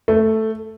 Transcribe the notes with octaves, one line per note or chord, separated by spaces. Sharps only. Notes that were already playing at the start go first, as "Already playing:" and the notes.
A3